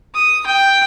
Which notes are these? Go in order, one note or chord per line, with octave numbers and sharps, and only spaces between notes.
D#6
G5